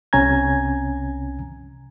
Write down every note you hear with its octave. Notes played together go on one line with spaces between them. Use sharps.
C2 C3 C#4 G#5 A#5 G#6